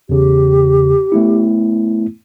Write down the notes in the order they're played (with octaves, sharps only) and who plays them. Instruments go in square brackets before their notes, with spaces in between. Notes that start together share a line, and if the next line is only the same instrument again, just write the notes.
[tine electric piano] E2 C#3 [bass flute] G4
[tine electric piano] A3 B3 E4